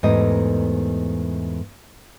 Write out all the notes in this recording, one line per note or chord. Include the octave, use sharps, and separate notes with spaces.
E2 G#2 A3 G4 A#4 D#5